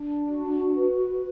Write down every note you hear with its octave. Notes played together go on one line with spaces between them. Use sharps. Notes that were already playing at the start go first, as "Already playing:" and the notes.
Already playing: D4
F#4
B4